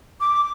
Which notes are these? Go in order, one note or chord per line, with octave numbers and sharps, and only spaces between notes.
D6